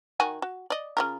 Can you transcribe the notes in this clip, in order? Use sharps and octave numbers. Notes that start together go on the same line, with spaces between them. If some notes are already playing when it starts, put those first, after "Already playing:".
D#3 F#4 G#5
F#4
D5 D#5
C#3 F4 A#4